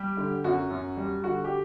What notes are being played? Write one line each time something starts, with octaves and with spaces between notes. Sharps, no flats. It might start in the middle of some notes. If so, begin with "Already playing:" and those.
Already playing: G3 G4
D3
F#2 F#4
F#2
G3
D3 F#4
G4